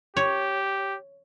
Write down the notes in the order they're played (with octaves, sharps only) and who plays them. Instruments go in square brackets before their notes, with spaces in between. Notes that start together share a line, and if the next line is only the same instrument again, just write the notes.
[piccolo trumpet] G4 [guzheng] C#5